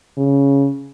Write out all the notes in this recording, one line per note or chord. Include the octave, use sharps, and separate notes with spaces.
C#3